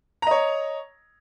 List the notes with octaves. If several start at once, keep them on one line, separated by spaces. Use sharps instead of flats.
C#5 D#5 A#5